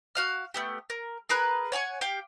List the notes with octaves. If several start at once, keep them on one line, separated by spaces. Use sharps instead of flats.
F#4 F5 F6
A3 B3 G4
A#4
G#4 A#4 B4 F#6
C#5 F#5 G#5 C#6
G4 F5 G5